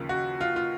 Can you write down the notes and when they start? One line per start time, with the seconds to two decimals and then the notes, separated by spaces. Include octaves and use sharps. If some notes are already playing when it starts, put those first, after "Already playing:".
Already playing: D#2 C#3 F3 A#3
0.09 F#4
0.41 F4
0.56 F4